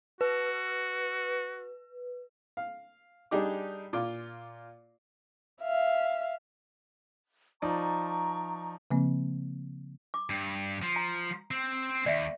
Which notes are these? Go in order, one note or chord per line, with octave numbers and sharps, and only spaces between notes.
F#4 B4
F5
G3 D4 D#4 G4 G#4 D6
A#2 F4 D6
E5 F5
F3 D#4 D5 A#5 C#6
C#3 F3 A#3 C4
D6
G2
F3
A#5
C4
D#2 D5 E5